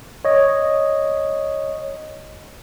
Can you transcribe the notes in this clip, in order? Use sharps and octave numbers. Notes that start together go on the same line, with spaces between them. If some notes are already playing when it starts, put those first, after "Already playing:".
C#5 D#5